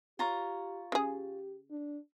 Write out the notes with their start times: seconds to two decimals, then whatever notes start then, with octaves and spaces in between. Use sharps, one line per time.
0.19 F4 G4 C#5 A#5
0.92 C#3 G4 G#4
1.71 D4